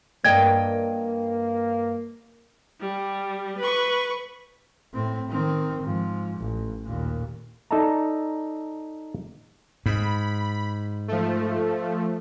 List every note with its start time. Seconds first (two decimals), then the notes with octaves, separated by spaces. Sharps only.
0.24 G2 A#3 A#4 D5 D#5 G5 G#6
2.80 G3
3.59 B4 C#6
4.94 A2 C4
5.30 D#3 C4
5.82 G#2 F3
6.39 A1
6.84 D#2 A#2
7.71 D#4 A4 D5 E5 A5 A#5
9.86 G#2 B5
11.08 F3 A3